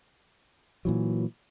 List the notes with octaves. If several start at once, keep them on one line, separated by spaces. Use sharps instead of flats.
A#2 E3 F#3